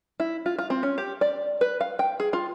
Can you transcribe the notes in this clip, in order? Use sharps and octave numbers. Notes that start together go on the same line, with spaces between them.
E4
F4
F4
C4
C#4
G4
D5
B4
F5
G5
G#4
F4